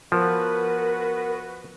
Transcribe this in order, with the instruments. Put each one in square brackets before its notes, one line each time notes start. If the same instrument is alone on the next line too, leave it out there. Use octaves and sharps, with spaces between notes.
[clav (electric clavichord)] F3 [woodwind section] B3 F#4 B4 [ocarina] A#4